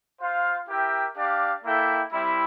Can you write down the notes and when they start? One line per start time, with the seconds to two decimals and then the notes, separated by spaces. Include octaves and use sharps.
0.21 F4 C5 F5
0.69 E4 G4 A#4 E5 G5
1.17 D4 G4 D5 F5
1.65 A#3 E4 A4 E5 G5
2.12 G3 C4 E4